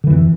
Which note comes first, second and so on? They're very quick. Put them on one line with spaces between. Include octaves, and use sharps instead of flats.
D3 E3 F2